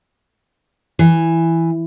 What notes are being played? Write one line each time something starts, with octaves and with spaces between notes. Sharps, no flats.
E3